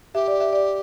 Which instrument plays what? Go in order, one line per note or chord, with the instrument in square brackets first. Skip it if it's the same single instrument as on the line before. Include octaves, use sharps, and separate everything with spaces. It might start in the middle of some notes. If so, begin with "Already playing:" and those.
[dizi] G4 [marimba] E5
[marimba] D5
E5
D5